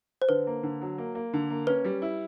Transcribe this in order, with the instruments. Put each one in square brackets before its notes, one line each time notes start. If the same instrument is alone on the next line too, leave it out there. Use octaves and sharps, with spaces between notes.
[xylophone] C5
[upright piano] D3 [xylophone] B4
[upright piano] A#3
D3
F#3
A#3
A#3
D3
A#3
[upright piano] C#4 [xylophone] B4
[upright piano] G3
E4